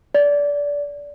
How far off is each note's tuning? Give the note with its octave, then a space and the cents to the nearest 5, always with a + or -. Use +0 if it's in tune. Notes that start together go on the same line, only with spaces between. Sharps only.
D5 -20